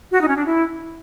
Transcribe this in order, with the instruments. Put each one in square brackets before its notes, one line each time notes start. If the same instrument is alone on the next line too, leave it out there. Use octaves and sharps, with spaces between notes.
[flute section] F#4
D#4
C#4
D4
E4